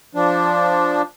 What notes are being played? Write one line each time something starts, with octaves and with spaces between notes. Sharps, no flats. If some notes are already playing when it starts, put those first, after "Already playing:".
F3 D4